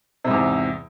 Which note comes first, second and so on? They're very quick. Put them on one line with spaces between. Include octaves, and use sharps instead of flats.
C3 G#2 E2